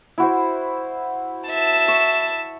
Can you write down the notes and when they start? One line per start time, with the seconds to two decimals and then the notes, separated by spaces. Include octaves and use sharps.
0.18 E4 F#4 C5
1.49 E5 A5
1.88 C#6